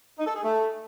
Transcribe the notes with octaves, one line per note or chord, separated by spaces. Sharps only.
D#4
A4
G#4
A3